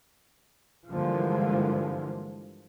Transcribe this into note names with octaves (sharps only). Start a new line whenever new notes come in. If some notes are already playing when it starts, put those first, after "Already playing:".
G2 D3 E3 F3 G#3 A#3